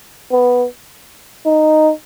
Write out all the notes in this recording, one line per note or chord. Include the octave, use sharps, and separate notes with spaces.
B3
D#4